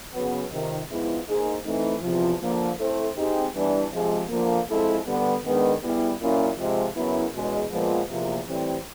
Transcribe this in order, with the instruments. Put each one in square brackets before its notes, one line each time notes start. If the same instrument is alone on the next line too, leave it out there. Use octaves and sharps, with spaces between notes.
[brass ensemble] C#3 F#3 B3
F2 C3 D#3
G#2 F3 G#3 B3 E4
A#3 D#4 G#4 C5
E3 A3 C4 D#4
E2 C3 F3
D3 F3 A#3
A3 C4 E4 A4 C5
G#3 C4 D#4 G4
E3 G3 B3 D4
C3 F3 G#3
D3 F3 A#3
F3 G#3 C4 E4 A4
D3 G3 B3
D#3 G#3 B3 D4
G3 B3 E4 G#4
A#2 F#3 A#3 C#4 E4
C3 F3 G#3
F#2 C#3 F#3 B3 E4
E2 B2 G#3 C#4
A#2 F3 G#3 B3
E2 C3 F3 A#3
A2 E3 G3 C4